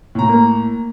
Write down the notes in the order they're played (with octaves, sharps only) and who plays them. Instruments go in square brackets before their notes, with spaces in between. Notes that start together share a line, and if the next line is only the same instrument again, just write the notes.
[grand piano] A2 A#5
[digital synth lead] A#3